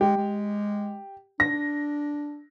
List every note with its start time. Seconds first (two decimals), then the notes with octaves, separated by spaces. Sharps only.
0.01 G#3 G4
0.18 G#3
1.40 D4 A#6